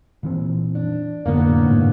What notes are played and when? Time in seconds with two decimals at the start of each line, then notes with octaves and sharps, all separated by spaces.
0.23 A#2 E3 C4
0.75 D4
1.25 F1 A2 D3 A#3 B3
1.63 F#1 G#2 C3